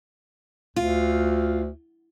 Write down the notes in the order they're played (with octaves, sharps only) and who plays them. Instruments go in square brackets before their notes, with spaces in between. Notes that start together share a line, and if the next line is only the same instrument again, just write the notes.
[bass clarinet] D2 [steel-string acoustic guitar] F4